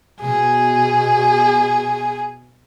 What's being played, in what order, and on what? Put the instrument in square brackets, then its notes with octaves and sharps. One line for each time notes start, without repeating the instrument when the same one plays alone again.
[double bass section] B2 [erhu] G#4